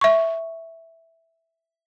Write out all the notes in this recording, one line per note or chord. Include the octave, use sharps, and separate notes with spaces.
E5 C#6